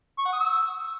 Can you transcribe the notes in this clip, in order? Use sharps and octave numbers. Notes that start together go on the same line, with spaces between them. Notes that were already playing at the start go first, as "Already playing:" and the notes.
C#6
F#5
D#6
E6